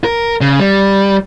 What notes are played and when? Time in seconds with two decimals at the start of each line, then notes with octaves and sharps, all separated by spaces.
0.04 A#4
0.41 C#3
0.60 G3